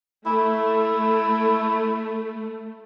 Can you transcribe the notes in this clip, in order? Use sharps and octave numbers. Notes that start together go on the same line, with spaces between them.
A3 E4